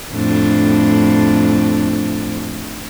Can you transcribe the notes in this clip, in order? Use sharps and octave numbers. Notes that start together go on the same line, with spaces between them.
F2 A2 D4